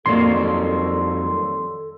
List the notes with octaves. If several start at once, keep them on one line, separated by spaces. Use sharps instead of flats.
F2 D#3 F#3 G3 A#3 A4 C6